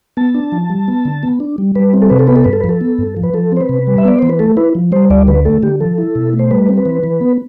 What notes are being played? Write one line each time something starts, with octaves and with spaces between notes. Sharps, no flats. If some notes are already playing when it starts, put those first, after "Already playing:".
B3 A5
D4
F3
G3
B3
D3
B3
D4
G3
G3 B4
C4
A4
C3 B4
A4
B3 B4
A4
G2 B4
A4
B4
F3
A4
B3
G2
F3
B4
F3 A4
C4 C5
B4
C3
G3
E5
B3 D5
E3 C5
B4
A3 A4
E4 B4
F3
G3 C5
D2 D5
D3 B4
A3 A4
D3 G4
F3 A4
E4
B2
A3
C5
G3 B4
C4
B4
E3
E3
B3